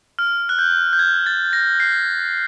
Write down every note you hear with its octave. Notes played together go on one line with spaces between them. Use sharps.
F6
F#6
G6
G6
G#6
A6
A#6
C7